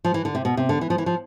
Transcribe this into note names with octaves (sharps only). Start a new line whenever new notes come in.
F3
E3
D3
C3
B2
C3
D3
E3
F3
E3
F3